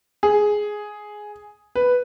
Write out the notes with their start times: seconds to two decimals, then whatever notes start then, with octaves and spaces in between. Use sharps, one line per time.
0.23 G#4
1.76 B4